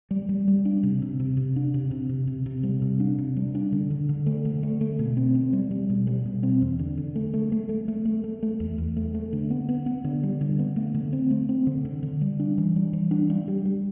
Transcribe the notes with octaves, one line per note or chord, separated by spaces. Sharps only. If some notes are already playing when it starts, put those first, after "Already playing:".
G3
G3
G3
D4
C3
C3
C3
C3
D4
C3
C3
C3
C3
C3
G3
C3
D4
C3
G3
D4
D3
D3
D3
A3
D3
A3
A3
B2
C4
C4
G3
G3
B2
G3
B2
C4
E2
D3
D3
A3
A3
A3
A3
A3
A3
A3
A3
E2
E2
A3
A3
D3
B3
B3
B3
D3
G3
D3
B3
A3
D3
C4
A3
C4
D3
D3
D3
G3
D4
E3
G3
E3
D4
G3
G3
G3